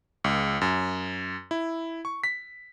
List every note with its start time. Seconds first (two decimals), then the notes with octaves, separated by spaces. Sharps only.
0.24 C#2
0.61 F#2
1.51 E4
2.05 C#6
2.24 B6